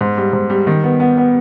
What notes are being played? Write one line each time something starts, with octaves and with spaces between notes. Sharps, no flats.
G#2
G3
G#2
G3
D#3
B3
B3
B3